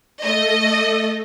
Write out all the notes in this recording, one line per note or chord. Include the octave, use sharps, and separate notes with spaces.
A3 A4 D#5